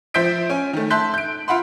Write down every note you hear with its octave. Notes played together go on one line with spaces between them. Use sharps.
F3 C5 E5 G6 B6 D7
C#4 G#5
D#3 A3
E5 A5 C6 F#6 G6 B6
G6 D7
F4 E5 F#5 B5 C6